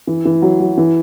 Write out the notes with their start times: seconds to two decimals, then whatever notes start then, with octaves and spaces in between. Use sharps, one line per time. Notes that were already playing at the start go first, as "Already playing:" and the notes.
0.07 E3
0.25 E3
0.42 F#3
0.60 F#3
0.78 E3